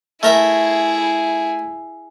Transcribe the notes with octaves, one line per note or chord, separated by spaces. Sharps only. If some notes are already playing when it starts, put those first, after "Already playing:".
A3 E4 G#4 A#4 E5